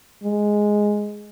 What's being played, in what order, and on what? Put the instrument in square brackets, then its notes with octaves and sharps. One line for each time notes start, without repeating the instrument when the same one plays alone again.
[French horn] G#3